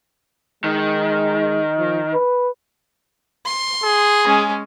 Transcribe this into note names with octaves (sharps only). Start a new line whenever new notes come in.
D#3 G#3
F3
B4
C6
G#4
G#3 C#4